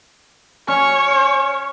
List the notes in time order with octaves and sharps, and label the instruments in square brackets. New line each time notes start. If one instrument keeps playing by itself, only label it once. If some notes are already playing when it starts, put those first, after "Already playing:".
[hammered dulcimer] C#4 [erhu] C#5